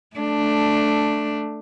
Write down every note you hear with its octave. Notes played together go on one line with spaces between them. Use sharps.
A3 D4